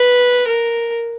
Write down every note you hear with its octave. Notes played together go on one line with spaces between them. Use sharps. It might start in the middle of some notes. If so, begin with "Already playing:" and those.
Already playing: B4
A#4